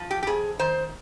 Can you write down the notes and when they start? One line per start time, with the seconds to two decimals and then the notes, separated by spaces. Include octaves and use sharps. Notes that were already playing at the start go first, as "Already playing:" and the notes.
Already playing: F3
0.11 G4
0.23 G4
0.27 F2 G#4
0.59 D#3 C5